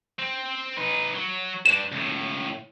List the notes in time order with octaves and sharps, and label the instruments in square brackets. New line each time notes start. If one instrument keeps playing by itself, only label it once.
[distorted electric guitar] C4
D#4 B4
F#3
[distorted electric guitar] G2 D4 [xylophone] E7
[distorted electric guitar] C#2 A2